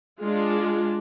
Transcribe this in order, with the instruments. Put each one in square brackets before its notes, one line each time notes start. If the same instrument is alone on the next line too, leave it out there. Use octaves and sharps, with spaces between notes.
[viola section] G#3 D4 F4